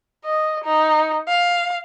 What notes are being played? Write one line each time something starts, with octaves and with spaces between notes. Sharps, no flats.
D#5
D#4
F5